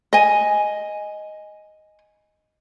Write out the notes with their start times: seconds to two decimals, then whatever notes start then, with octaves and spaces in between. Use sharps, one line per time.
0.13 D#5 G#5